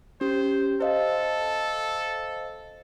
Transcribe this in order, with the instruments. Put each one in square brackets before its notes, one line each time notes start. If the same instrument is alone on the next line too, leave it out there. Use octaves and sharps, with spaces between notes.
[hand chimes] C#4 G4 [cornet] C5
[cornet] A4 [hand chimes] C5 D#5 F5